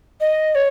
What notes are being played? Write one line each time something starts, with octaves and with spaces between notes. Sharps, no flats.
D#5
C#5